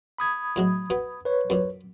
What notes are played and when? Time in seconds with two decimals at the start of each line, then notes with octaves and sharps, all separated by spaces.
0.18 B5 D#6 G#6
0.56 A2 F#3 G#3
0.90 B2 B3
1.25 B4 C#5
1.50 F#2 A#2